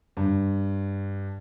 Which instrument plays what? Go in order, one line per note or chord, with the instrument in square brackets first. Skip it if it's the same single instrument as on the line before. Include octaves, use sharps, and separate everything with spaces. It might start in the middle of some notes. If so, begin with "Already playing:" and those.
[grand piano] G2